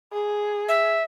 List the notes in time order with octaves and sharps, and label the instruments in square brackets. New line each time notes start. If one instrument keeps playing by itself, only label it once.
[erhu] G#4
[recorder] E5